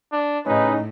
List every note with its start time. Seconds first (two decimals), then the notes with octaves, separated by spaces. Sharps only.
0.12 D4
0.47 A2 C#3 C#4 D#4 B4